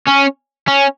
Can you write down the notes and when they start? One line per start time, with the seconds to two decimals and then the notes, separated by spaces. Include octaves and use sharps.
0.07 C#4
0.68 C#4